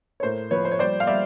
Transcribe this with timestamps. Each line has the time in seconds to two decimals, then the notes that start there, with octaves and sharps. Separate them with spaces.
0.20 C#5
0.23 A2 A#4 C5
0.51 F3 B4 C#5
0.65 C5
0.72 C#5
0.79 G3 C5 D5
1.00 F5
1.07 G3 D5 E5